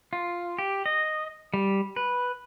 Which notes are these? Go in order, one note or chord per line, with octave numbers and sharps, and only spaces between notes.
F4
G4
D#5
G3
B4